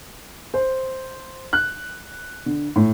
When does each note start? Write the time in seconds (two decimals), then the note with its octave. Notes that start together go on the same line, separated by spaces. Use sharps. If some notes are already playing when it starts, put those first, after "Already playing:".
0.54 C5
1.53 F#6
2.46 D3
2.76 A2